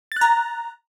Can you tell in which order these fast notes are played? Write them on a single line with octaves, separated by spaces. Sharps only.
A6 F#6 A#5